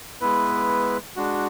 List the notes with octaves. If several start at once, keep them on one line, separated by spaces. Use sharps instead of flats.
G#3 B3 E4 B4
G#3 D4 F#4